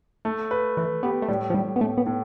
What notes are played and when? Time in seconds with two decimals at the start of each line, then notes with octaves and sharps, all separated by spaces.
0.25 A3
0.51 B4
0.77 E3 B4
1.03 B3 G4
1.22 A3
1.28 A2 G3
1.50 F3
1.54 A2 G3
1.76 B3
1.80 A2 A3
1.97 B3
2.06 A2